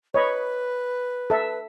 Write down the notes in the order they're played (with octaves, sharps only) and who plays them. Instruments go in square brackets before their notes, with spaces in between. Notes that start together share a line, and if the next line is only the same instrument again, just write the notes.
[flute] B4 [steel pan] C#5 D#5 B5
[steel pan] A4 E5